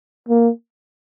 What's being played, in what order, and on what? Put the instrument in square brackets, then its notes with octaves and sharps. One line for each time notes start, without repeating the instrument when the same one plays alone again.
[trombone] A#3